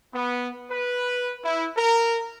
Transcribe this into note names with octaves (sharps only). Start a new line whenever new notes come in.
B3
B4
E4
A#4